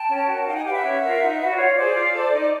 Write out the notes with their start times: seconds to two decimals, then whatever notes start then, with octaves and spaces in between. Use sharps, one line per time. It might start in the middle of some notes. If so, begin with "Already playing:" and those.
Already playing: G5 A5
0.09 C#4
0.28 F#4 A#4 C#5
0.41 F#5
0.45 D#4 F5 G5
0.55 F#5 G#5
0.64 G4 B4 F5 G5
0.74 E5 F#5
0.83 C#4
1.01 F4 A#4
1.21 D#4
1.39 F#4 B4
1.50 D5
1.57 F4 C#5
1.76 G#4 C5 D5
1.94 F4
2.13 A4 C5
2.32 D#4